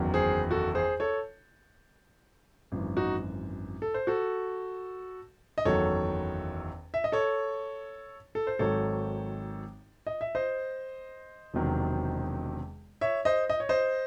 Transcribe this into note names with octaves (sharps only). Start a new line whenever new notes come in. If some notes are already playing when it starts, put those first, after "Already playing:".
Already playing: F#1 E2 D#3 F#3
G#4 C5
F#4 A4
G#4 C5
A4 C#5
G#1 F#2 E3
D#4 F#4
A4
C5
F#4 A4
D#5
F#1 E2 D#3 F#3 A4 C#5
E5
D#5
A4 C#5
A4
C5
G#1 G#2 D#3 F#3 A4 C#5
D#5
E5
C5 D#5
E1 E2 C3 D#3 F#3
C#5 E5
C5 D#5
D#5
C#5
C5 D#5